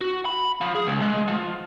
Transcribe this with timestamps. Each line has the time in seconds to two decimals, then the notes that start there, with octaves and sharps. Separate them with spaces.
0.01 F#4
0.25 B5
0.61 F3
0.75 G#4
0.87 C#2
1.01 G#3
1.28 F3